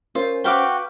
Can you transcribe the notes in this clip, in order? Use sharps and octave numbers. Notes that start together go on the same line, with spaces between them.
C#4 F4 A#4 C5
F#4 B4 F5 G5 D6 G7